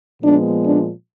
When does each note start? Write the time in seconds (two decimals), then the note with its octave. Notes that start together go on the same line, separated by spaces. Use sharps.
0.22 A#2 F3 G#3 B3 D4
0.65 D4